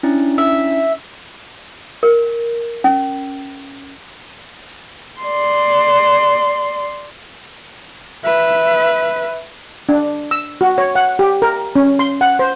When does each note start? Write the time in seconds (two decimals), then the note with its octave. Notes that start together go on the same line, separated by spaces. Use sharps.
0.03 C#4 D4 E4
0.38 E5
2.03 A#4
2.84 C#4
5.21 D5 C6
8.24 B4 E5
9.89 D4
10.31 E6
10.61 F#4
10.78 C#5
10.95 F#5
11.19 G4
11.42 A#4
11.76 C#4
11.99 C6
12.21 F#5
12.39 C5